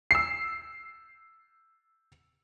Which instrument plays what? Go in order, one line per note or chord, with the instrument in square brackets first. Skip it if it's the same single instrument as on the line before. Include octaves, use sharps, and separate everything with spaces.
[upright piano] E6 C7